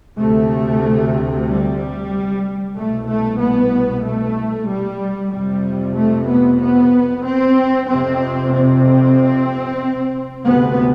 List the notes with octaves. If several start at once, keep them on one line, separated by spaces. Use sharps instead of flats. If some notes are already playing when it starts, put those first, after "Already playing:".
D2 C3 A3
G3
C2 B2 A3
A3
B3
A3
G3
F2 C3 G3
A3
B3
B3
C4
F2 C3 C4
C4
D2 C3 B3